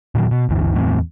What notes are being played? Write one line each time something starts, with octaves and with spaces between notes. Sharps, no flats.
A#2 D#3 F#3
B2
G1 D2 D3 E3
E2 A2 C4